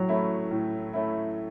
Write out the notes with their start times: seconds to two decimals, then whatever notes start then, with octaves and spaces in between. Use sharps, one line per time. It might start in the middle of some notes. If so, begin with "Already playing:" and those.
Already playing: A2 F#3
0.09 A3 C#4 E4
0.51 A2
0.93 A3 C#4 E4